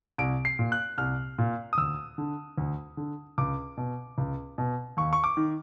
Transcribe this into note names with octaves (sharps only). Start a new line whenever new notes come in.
C2 D7
C7
A#2
F#6
C2 F6
A#2
D#6
D2 E6
D3
D2
D3
C#2 D6
B2
C#2
B2
D#2 C#6
C#6
D6
D#3